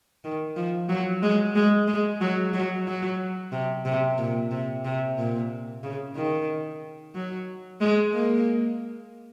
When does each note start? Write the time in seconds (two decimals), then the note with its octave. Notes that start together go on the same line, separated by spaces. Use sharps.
0.24 D#3
0.56 F3
0.89 F#3
1.23 G#3
1.55 G#3
1.88 G#3
2.21 F#3
2.54 F#3
2.87 F#3
3.52 C3
3.85 C3
4.18 A#2
4.51 C3
4.85 C3
5.18 A#2
5.84 C#3
6.16 D#3
7.15 F#3
7.81 G#3
8.14 A#3